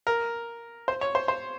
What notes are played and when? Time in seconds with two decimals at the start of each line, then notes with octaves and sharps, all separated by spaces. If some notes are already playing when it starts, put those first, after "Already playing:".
0.07 A#4
0.88 C5
1.01 C#5
1.15 C5
1.28 C5